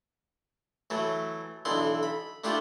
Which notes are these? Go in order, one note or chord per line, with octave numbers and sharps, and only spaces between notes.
E3 F#3 A3
B1 D3 E3 E4 C6
B5
A3 D4 E4 F4 G4